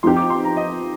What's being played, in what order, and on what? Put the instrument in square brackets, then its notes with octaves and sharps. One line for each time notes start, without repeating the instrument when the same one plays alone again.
[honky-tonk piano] F3 C4 D#4 G4 [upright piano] C6
[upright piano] D6
C6
A#5
D#5